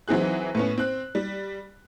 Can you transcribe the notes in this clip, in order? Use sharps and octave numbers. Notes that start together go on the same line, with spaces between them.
E3 F#3 C4 D#4 G#4 F#6
A2 B3 C#4
C4 F#6
G3